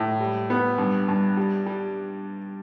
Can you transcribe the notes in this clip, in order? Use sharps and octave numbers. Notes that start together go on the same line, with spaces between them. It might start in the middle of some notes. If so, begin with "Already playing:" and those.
Already playing: A2
G3
B3
G2
G2
G3
G3